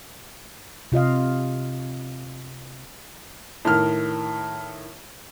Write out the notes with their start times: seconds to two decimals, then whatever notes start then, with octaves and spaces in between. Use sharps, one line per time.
0.92 C3 F4 D#5 F5
3.65 A2 D#3 F6